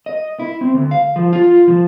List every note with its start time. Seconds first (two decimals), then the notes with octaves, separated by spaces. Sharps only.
0.06 D#5
0.39 E4
0.61 C4
0.74 D2
0.91 F5
1.16 F3
1.33 F4
1.68 F3